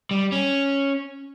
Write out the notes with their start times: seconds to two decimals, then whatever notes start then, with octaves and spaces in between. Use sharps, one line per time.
0.11 G3
0.32 C#4